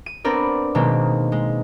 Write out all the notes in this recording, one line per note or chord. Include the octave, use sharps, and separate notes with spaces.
D#7
B3 C4 D4 A#4 D5
B2 D#3 G#3 A#3 C4
G#3